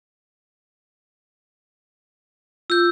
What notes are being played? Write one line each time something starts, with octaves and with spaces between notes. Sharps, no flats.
F4 E6 G6